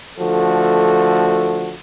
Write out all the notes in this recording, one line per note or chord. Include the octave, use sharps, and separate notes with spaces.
D3 F3 A3 F#4 A4